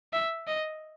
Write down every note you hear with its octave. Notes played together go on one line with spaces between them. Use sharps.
E5
D#5